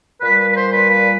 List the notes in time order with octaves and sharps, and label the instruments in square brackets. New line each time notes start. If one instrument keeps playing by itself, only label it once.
[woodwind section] A#2 G3 A#3 B4
B4
B4
C5
B4
B4